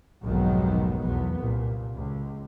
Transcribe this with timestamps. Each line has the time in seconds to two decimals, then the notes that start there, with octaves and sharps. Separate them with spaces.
0.23 F1 B1 G#2 D#3 F#3 B3
1.04 B1 E2 B3
1.38 C2 A#2
1.95 C#2